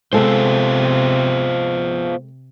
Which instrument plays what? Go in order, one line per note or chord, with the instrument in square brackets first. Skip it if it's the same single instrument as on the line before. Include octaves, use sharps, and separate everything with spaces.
[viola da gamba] C3 [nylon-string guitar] G#3 A4 [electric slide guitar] B3 F4 C5